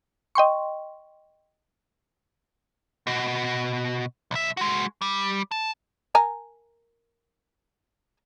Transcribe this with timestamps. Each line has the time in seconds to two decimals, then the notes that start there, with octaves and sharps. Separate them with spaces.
0.35 D#5 G5 C6 C#6
3.07 B2 F#4
4.31 B1 E5
4.57 G#3 F#4
5.02 G3
5.52 A5
6.15 A#4 G#5 A#5